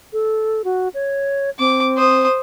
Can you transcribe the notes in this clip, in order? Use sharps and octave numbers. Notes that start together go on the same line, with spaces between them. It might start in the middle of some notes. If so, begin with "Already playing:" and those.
A4
F#4
C#5
C4 D6
C5 D#6